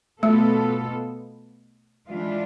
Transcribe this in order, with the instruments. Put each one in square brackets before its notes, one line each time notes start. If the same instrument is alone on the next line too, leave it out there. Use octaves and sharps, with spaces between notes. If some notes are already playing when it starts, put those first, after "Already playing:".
[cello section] B2 B3 F4 A4 [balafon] A3
[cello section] E3 G#3 D4 F4